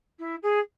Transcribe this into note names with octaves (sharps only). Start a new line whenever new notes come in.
E4
G#4